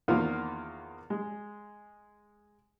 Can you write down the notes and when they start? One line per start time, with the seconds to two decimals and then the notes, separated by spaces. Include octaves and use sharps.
0.08 E2 D#3 A#3 C4 F4
1.10 G#3